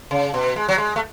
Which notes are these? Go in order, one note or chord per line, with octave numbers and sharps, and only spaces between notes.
C#3
B2
G#3
F#3
G#3
A3